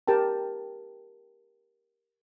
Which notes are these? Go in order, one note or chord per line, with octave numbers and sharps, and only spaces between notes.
G4 A#4 G5 A5